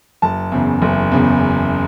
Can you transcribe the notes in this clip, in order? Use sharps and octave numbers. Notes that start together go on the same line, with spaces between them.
F#1 A5
E2 C#3
F#1
E2 C#3